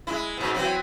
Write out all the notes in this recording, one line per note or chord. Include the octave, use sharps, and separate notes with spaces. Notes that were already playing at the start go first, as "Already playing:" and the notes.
G#3 E4
G#2 B2
E3 F#3 C4